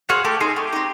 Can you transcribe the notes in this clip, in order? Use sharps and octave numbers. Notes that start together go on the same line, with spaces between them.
F#4 G#4 C5 F5
A3 G4
C4 D#4 G#4
A3 G4
C4 D#4